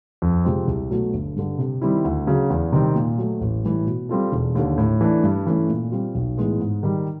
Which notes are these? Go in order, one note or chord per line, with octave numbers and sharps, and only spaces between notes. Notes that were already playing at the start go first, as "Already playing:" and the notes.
F2
C3 F3 G#3 C4
C2
B2 F#3 A3
G1
G2 D3
C3
D#3 G3 C4 E4
D2
C#3 F#3
E2
C3 D#3 G3 C4
A#2
F#3 A3
A1
A2 E3 G3
B2
G3 C4 F4 A4
E1
D#2 D3
A2
E3 A3 D4
G2
E3 A3 C#4
A#2
G3 C4 F4
B1
A2 E3 G#3 B3
G#2
D#3 G3